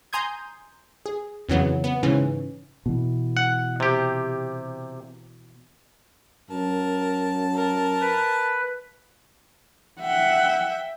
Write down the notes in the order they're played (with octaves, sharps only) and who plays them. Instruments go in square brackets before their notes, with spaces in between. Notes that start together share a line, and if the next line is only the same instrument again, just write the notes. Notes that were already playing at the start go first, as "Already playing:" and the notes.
[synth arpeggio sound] G#5 A#5 C6 D#6 G6 G#6
G#4
F2 C#3 E3 F#3 B3
B3
G#2 C#3 E3 C#4
[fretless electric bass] B2 E3
[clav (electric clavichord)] F#5
C3 G4
[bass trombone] F#2 [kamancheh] A#4 [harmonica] A5
[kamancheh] A#4
[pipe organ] B4
[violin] E5 G5 [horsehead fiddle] F#5